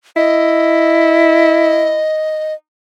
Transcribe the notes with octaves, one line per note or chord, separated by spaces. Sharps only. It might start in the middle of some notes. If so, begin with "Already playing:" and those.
E4 D#5